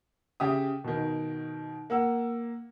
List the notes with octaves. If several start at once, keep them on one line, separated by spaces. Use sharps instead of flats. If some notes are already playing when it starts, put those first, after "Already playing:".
C#3 G4 E5 D#6
B2 D#3
A#3 F#5 E6